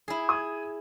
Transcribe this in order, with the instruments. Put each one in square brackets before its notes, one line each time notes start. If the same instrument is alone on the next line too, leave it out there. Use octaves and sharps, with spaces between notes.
[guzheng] E4 G#4
[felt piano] D#6 G#6